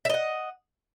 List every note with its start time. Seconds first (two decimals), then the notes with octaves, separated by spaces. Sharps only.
0.05 E5
0.09 D#5
0.14 F#5